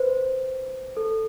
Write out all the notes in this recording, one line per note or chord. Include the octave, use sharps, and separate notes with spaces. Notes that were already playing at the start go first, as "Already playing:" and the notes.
Already playing: B4 C5
A4